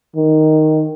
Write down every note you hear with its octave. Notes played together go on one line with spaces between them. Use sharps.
D#3